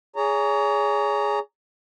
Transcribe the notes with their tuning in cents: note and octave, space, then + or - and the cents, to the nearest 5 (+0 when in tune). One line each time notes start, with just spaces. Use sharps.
G#4 +0 C#5 +35 A#5 -10